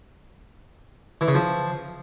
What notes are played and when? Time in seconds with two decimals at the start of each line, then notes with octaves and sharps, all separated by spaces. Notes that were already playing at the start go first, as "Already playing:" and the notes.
1.21 E3
1.28 C#3
1.35 F3